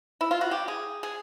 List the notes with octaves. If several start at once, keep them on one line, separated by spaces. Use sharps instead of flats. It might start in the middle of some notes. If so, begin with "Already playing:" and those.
E4
F4
F#4
G4
G#4
G#4